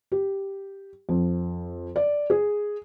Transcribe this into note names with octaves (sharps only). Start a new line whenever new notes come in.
G4
F2
D5
G#4